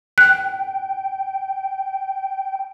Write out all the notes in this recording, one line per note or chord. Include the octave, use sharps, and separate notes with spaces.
G5 F#6